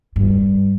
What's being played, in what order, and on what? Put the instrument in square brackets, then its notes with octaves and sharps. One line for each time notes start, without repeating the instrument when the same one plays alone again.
[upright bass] G2